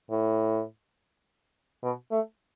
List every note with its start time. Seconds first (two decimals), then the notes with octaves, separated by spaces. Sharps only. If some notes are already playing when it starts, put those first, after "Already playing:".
0.11 A2
1.83 B2
2.11 A3